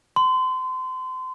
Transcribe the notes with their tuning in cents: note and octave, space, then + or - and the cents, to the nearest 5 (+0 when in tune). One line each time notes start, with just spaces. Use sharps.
C6 -30